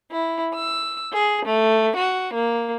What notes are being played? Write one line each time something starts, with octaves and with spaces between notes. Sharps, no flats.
E4
E6
G#4
A3
F#4
A#3